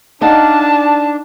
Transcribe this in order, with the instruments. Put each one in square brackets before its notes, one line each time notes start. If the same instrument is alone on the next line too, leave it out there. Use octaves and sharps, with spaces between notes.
[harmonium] D4 [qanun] D#4 F5 F#5 [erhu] A5